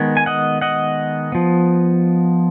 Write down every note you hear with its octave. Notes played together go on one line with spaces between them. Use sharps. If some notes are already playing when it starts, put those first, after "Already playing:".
Already playing: D#3 G#3 B3
G#5
D#5 F#5
D#5 F#5
F3 B3